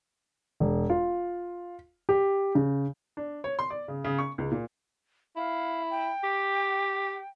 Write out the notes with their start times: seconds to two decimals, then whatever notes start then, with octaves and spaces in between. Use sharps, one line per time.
0.60 E1
0.90 F4
2.09 G4
2.55 C#3
3.17 D4
3.44 C#5
3.59 C6
3.70 D5
3.88 C#3
4.04 C#3
4.19 C#6
4.38 C#2
4.51 A#2
5.37 E4 F5
5.90 G5
6.24 G4